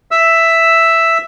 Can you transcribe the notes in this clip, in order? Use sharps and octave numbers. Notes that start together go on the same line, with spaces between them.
E5 E6